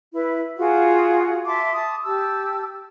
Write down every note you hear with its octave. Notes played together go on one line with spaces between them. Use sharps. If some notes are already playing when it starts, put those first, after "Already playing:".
E4 B4
F4 F#4 G#4 F#5
E5 A5 C6 D6
A5 D#6
G4 A5 E6